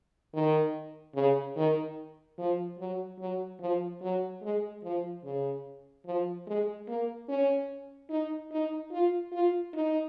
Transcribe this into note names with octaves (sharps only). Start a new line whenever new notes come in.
D#3
C#3
D#3
F3
F#3
F#3
F3
F#3
G#3
F3
C#3
F3
G#3
A#3
C#4
D#4
D#4
F4
F4
D#4